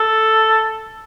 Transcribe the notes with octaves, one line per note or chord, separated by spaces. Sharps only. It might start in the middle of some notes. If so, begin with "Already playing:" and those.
Already playing: A4